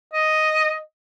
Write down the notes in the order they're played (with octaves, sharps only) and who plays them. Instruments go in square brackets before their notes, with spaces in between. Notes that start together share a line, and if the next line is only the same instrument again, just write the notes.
[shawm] D#5